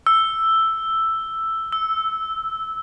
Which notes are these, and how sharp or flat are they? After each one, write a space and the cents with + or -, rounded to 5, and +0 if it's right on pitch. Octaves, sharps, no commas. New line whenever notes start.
E6 +5
E6 -15